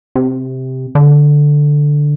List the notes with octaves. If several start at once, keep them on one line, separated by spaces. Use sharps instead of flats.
C3
D3